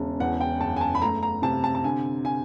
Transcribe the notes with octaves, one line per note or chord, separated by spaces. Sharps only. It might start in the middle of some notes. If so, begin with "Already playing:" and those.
Already playing: E1 C#3
E2 F#5
G5
F#1 A5
G#5
A5
B5
A3 A#5
A#5
C3 A5
A5
A5
D3 G#5
D3 G#5